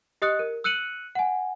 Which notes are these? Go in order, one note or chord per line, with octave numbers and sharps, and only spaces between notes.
G4 D#5 D#6 F#6 C#7
A#4
E6 F#6 C#7 D#7 F#7
F#5 G#5